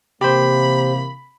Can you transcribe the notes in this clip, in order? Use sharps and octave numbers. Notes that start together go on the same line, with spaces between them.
C3 E3 A#3 G4 C5 B5